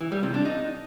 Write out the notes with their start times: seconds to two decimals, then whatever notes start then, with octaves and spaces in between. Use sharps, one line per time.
0.01 E3
0.12 G3
0.23 C3
0.34 D4
0.45 D#4